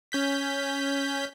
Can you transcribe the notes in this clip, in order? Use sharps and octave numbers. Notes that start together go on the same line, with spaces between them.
C#4 G6 B6